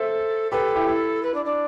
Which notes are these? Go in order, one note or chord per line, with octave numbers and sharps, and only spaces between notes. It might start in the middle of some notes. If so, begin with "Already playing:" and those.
Already playing: A4 C5 E5
G4 A4 B4
E4 G4
E4
B4
D4
D4